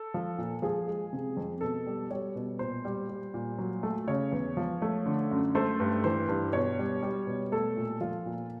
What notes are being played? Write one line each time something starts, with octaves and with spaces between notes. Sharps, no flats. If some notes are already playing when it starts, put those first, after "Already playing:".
Already playing: A4
F3
A#2
F3 G#4
G#3
C3
F2
B2 A4
G3
G3 C#5
B2
A#2 C5
G3
G3
A#2
F#3
A3
C#3 C#5
E2
F3
A3
D3
F#2
A3 C5
G2
E3 C5
G2
B2 C#5
G3
G3
B2
A3 A4
A#2
F3 F4
A#2